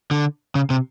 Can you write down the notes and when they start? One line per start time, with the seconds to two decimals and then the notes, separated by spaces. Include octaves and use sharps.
0.11 D3
0.55 C#3
0.70 C3